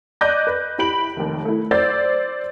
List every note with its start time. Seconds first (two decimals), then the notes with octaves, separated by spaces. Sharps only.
0.21 D5 D#5 D6 F#6 G6 A#6
0.47 B4
0.78 E4 G4 B5 D7 F#7
1.16 F1 D#2
1.45 A3 E4
1.71 C5 D5 E6 G6 A6